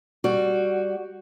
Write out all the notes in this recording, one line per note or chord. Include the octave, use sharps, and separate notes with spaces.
G3 F#4